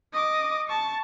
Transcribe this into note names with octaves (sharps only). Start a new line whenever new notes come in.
D#5 D6
A5 C#6